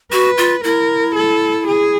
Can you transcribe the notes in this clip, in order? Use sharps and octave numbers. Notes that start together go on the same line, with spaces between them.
F#4 B4
F4
E4 A#4
A4
G#4